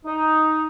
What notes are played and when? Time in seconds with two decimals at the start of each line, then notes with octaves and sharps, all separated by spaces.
0.05 D#4